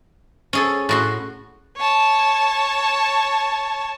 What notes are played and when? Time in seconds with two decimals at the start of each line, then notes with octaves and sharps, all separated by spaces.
0.53 C#4 G#4 A4
0.89 A2 F#4 C6
1.77 C#5 A5